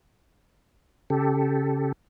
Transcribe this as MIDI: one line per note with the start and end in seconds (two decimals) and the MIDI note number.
1.10 1.92 49
1.10 1.92 67
1.10 1.92 69